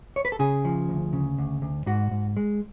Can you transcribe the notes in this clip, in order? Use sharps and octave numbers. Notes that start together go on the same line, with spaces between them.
C#5
B4
A4
C#3 G#4
F3
D2
C#3
D2
D2
G#2 F#4
G#2
G#3